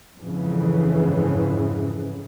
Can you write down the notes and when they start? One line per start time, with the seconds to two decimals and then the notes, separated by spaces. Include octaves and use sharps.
0.19 F2 G#2 C#3 E3